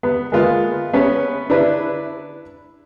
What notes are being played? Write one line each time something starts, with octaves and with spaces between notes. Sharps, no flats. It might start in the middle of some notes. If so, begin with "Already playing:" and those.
B3
G#3 A#3 B3 F4
B3 C#4 B4
D4 E4 B4